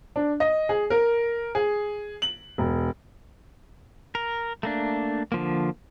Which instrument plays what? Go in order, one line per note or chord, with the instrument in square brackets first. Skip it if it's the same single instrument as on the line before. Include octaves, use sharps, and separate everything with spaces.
[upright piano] D4
D#5
G#4
A#4
G#4
F#7
E1
[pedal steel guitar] A#4
A3 A#3 D4
D3 F3 A#3